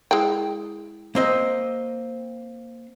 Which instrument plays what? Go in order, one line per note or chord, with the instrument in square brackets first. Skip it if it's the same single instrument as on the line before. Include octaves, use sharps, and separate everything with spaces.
[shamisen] G#3 E4 G5
[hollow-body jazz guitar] A#3 C4 D#5